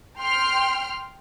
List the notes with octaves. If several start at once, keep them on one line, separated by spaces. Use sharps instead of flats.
G5 C6 F6